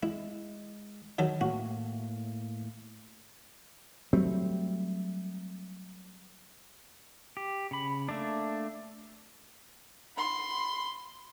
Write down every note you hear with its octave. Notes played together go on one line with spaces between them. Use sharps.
G#3 E4
D#3 F#3 A4
A2 A#3 F#4
F#3 G3 A3 C4
G4
C#3 B5
A3 A#3 D4
B5 C6